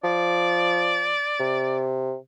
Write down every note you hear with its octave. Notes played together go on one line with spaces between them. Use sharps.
F3 D5
C3